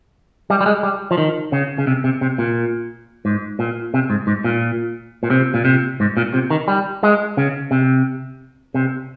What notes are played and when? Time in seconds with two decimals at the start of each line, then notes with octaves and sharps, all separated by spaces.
0.50 G3
0.61 G3
0.66 G#3
0.83 G3
1.11 F3
1.18 D#3
1.52 C#3
1.78 C#3
1.87 C3
2.04 C3
2.21 C3
2.38 A#2
3.25 G#2
3.59 A#2
3.94 C3
4.10 G#2
4.27 G#2
4.44 A#2
5.23 A#2
5.30 C3
5.54 A#2
5.65 C3
6.00 G#2
6.17 A#2
6.34 C3
6.50 D#3
6.68 G3
7.03 G#3
7.37 C#3
7.71 C3
8.74 C3